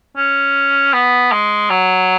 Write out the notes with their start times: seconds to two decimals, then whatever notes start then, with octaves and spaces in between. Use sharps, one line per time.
0.17 C#4
0.93 B3
1.32 G#3
1.70 F#3